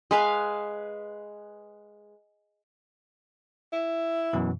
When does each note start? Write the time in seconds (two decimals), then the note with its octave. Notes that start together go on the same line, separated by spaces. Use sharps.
0.11 G#3 B4 F5
3.73 E4
4.33 F#2 B2 E3